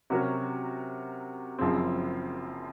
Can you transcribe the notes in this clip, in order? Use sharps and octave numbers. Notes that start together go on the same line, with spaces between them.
C3 F#3 C#4 F#4 A#4
F#1 F#2 F3 G#3 C4